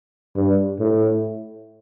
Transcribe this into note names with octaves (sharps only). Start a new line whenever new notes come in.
G2
A2